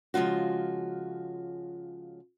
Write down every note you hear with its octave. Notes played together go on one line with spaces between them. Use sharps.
C#3 F3 G#3 F4 F#4